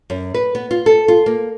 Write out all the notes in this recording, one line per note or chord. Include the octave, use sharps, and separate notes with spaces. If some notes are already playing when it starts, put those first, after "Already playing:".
F#2
B4
B3
F4
A4
F4
A#3